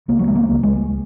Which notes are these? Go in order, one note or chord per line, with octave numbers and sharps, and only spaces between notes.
C#2 A#3
F#3
G#3
A#3
C#2
G#3